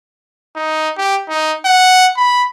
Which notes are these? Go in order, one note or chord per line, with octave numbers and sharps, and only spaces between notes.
D#4
G4
D#4
F#5
B5